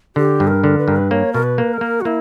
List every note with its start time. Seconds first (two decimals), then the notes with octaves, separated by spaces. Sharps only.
0.16 D3 G4
0.40 G2
0.47 A#4
0.64 D3
0.79 B4
0.87 G2 A#4
0.96 B4
1.11 A#3 C#5
1.33 B2 A#4
1.43 B4
1.58 A#3
1.73 A#4
1.81 A#3
2.01 F#4
2.05 A#3 E4